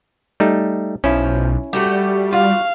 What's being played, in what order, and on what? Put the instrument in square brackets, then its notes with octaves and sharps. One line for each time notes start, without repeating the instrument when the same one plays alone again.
[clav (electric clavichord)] G3 A3 D#4
[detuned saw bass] B1 [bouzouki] F3 [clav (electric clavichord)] C#4 E4
[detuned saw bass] G3 [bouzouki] A3 F#4 G4
[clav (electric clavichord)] F4 [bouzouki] F#4 [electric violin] F5